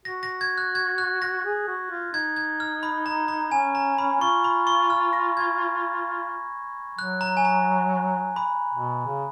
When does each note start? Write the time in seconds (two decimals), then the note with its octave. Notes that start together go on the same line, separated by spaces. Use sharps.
0.05 F#4 A#6
0.23 A#6
0.41 G#6
0.58 F#6
0.75 G#6
0.98 F#6
1.22 A#6
1.44 G#4
1.67 F#4
1.90 F4
2.13 D#4 G#6
2.36 G#6
2.60 F6
2.83 B5
3.06 A#5
3.28 A#5
3.51 C#4 G#5
3.75 A#5
3.98 B5
4.21 F4 C#6
4.44 B5
4.67 C#6
4.90 F6
5.13 A#6
5.37 G#6
6.98 F#3 F#6
7.21 A#5
7.37 G#5
7.45 A#5
8.36 B5
8.72 B2
9.06 C#3